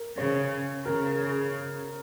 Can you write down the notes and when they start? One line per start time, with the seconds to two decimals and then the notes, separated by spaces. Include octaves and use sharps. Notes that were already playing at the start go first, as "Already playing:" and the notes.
Already playing: A#4
0.17 C#3 C#5
0.85 C#3 A#4